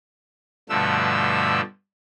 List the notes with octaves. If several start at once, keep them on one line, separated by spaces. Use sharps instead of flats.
G2 B2 D3 F3 A3 E6